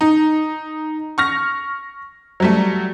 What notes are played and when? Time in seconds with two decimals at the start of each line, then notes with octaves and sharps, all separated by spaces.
0.01 D#4
1.18 C#6 F6 A#6
2.40 F#3 G3 A3